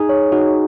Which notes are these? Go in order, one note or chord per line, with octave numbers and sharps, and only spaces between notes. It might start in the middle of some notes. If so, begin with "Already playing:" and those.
Already playing: D#4 G#4
C#5
D#4 F#4